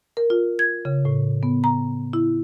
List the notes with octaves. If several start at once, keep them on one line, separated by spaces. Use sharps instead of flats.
A#4
F4
G#6
C#3
A2
B3
A#5
E4